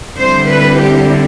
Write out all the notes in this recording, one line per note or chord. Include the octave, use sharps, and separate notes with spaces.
D3 G3 C4 E4 C5
B4
G4